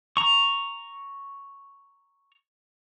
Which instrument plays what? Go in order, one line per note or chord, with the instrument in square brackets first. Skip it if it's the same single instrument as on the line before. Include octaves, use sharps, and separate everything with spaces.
[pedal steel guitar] A#5 C#6